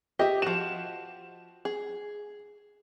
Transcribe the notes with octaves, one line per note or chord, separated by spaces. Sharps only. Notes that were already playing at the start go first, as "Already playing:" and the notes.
G4 D#5 E5
F3 F#4 E7
G#4